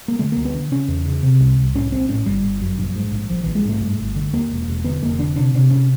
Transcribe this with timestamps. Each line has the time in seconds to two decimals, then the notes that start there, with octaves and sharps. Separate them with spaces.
0.08 A#3
0.19 D3 A3
0.32 D2 A#3
0.45 B3
0.54 D3
0.72 C#3 C#4
0.88 E2
1.06 C#3
1.23 C3
1.40 C2
1.57 C2
1.74 A2 C#4
1.92 A#1 C4
2.09 A2 C#4
2.26 G1 G3
2.44 G1
2.60 F#2
2.78 A#1
2.96 G#2
3.12 A#1
3.30 A#1 F3
3.43 A#1 E3
3.55 G#3
3.65 G#2 A3
3.82 G2
3.99 G1
4.16 D3
4.33 D#2 A#3
4.51 E1
4.68 E1
4.84 D3 B3
5.02 F1 A#3
5.19 D3 D4
5.36 C3 D4
5.54 C3 D4
5.71 C3 C#4